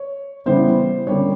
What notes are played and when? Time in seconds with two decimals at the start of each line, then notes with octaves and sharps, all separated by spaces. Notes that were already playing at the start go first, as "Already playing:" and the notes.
Already playing: C#5
0.46 C#3 E3 G3 B3 C5
1.07 D3 G3 A#3 C#4 C#5